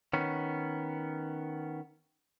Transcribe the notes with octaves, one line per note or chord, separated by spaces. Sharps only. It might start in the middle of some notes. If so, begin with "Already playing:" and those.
D#3 B3 C#4